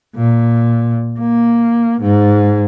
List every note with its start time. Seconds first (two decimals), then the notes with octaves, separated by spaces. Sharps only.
0.15 A#2
1.20 A#3
2.02 G#2